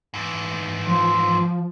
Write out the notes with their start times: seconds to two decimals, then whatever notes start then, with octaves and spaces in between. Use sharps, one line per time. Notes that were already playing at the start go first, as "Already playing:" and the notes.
0.14 G#2 E3
0.87 F3 C6